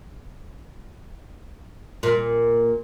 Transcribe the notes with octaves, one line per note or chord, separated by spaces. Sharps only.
A#2